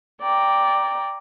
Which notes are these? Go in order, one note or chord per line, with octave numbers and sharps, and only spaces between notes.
D5 G5 A#5